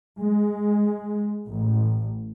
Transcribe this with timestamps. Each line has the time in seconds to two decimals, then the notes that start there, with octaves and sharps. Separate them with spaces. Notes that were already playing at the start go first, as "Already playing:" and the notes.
0.19 G#3
1.47 A1